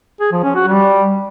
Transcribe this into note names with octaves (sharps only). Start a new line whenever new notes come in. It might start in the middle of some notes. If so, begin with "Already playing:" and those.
G#4
F3
C#4
F#4
G3